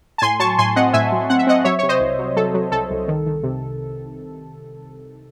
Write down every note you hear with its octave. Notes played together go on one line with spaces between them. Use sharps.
A5
A2 G#5 C6
F#3 A5 C#6
A2 G#5 C6
C4 D#5 F#5
A2 E5 G#5
F#3
C4 F#5
E5
C4 D#5 F#5
F#3 C#5 E5
C3 C#5
C5 D#5
C2
F#3
F#3 A4
F#3
C2 A4
C2
D#3
D#3
C3